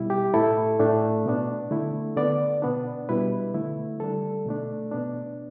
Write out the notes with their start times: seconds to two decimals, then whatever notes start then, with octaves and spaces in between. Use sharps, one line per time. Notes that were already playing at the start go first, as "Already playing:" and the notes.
Already playing: B2 G3 E4
0.10 G4
0.34 A2 A3 E4 A4
0.80 A2 A3 D4
1.26 B2 B3 D4
1.71 D3 A3 E4
2.16 D3 B3 D4 D5
2.62 B2 B3 D4
3.09 B2 G3 E4 B4
3.54 D3 A3 E4
4.00 D3 G3 D4 A4
4.46 B2 A3 D4
4.91 B2 B3 D4